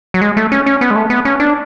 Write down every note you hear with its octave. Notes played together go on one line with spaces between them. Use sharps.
F#3
G#3
A3
C#4
C#4
B3
G#3
A3
B3
C#4
D4